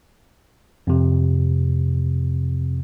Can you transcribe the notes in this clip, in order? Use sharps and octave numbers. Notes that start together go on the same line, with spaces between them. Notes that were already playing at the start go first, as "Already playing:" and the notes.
F2 C3